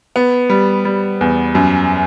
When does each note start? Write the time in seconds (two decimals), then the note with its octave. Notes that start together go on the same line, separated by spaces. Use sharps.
0.16 B3
0.50 G3
0.85 G3
1.21 E2
1.55 F#2